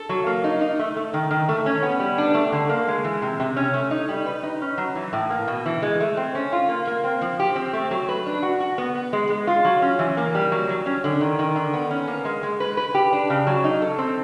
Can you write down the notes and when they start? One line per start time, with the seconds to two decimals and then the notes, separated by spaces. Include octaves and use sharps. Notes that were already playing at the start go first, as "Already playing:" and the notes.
Already playing: A4
0.09 F#3
0.26 A#3
0.44 D#4
0.61 D#4
0.79 A3
0.96 A3
1.14 D#3
1.31 D#3
1.49 A3
1.66 C#4
1.83 B3
2.00 G3
2.18 D4
2.34 A3
2.52 D3
2.69 A#3
2.88 G#3
3.04 E3
3.22 C3
3.40 C3
3.56 C#4
3.74 A3
3.91 D#4
4.09 G3
4.26 B4
4.43 D#4
4.61 C#4
4.78 F#3
4.95 E3
5.13 A2
5.30 A#3
5.47 B2
5.66 E3
5.82 G#3
6.00 A3
6.17 C4
6.35 C#4
6.52 F4
6.69 A#3
6.87 A#3
7.04 C4
7.21 F3
7.39 G4
7.56 C4
7.73 A3
7.91 F#3
8.09 B4
8.26 D4
8.43 F#4
8.60 F#4
8.78 B3
8.95 B3
9.13 G#3
9.29 G#3
9.47 F4
9.65 F#3
9.82 C#4
9.99 E3
10.17 A#3
10.35 G3
10.52 F#3
10.69 F#3
10.86 C#4
11.04 D3
11.21 D#3
11.39 D#3
11.56 D3
11.74 B3
11.91 C#4
12.07 A#3
12.25 G#3
12.43 G#3
12.60 B4
12.77 B4
12.95 G4
13.13 D4
13.30 C#3
13.47 F#3
13.64 D#4
13.82 A4
13.98 C4